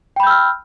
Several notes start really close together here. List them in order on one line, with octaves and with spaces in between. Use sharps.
G5 B5 G6 E6 F6